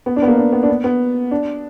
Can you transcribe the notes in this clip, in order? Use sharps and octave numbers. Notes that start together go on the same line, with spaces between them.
B3
D4
B3
A#3
D4
B3
D4
B3
B3
D4